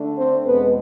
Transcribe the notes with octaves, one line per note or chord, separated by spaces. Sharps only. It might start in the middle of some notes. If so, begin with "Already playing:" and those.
Already playing: D3 A3 D4
C4 C5
E2 B2 G#3 B3 B4